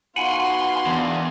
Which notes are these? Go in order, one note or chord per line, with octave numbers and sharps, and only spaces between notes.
B3 D#4 F4 F#4 F#5 G#5 B5 C6
E2 D4 A#4